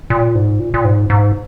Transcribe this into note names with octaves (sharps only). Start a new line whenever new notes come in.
A#2
G#2
A#2
A#2
G#2
G#2